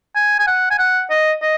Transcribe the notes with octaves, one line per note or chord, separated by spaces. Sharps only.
G#5
G#5
F#5
G#5
F#5
D#5
D#5